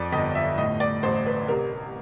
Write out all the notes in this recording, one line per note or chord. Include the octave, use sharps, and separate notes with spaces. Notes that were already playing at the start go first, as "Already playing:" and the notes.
Already playing: F2 D5
G1 D#5
E5
A2 D#5
D5
A1 C5
B4
C3 A#4